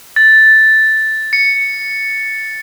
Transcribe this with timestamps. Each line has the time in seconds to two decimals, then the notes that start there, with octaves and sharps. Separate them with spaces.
0.16 A6
1.33 C#7